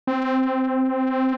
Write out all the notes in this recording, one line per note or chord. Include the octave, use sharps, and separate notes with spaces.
C4